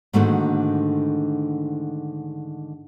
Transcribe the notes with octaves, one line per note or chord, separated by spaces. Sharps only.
G#2 D3 D#3 A3 A#3 F#4